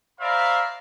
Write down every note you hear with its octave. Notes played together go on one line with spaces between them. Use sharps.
C5 D5 E5 F5 A#5 B5